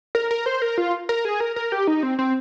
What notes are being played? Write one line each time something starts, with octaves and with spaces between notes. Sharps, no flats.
A#4
A#4
C5
A#4
F4
A#4
G#4
A#4
A#4
G4
D#4
C4
C4